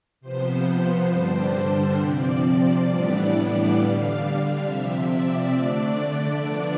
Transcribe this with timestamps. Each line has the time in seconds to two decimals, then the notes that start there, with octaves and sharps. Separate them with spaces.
0.21 C3 F3 B3 C5
1.09 G2 D3 G3 D4
1.97 C3 F3 C4 D5
2.86 A2 E3 G3 B3 D4
3.74 D3 G3 D4 F5
4.19 F5
4.63 C3 F3 C4 E5
5.07 D5
5.51 D3 A3 D4 D5
6.40 D3 F3 B3 D4